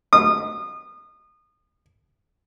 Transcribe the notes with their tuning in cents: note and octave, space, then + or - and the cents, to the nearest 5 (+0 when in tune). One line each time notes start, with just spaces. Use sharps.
D#6 -30